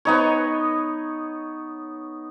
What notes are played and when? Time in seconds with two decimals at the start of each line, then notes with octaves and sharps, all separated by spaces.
0.05 B3 D#4 C#5